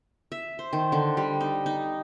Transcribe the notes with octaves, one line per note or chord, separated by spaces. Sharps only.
E5
C5
D#3
D3
G3
D#4
D#4